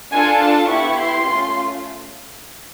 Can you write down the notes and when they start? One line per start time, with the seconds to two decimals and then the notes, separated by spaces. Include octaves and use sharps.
0.12 D4 F4 A4 G#5
0.40 A5
0.69 B3 E4 G4 C#6
0.98 C6
1.26 A3 C#4 F4